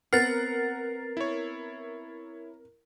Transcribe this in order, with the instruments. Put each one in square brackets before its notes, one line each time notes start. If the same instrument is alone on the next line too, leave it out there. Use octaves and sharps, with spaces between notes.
[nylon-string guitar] B3 C4 B4 [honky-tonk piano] A#4 [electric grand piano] F#5 F6 [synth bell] A6 C7
[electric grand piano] E4 C#5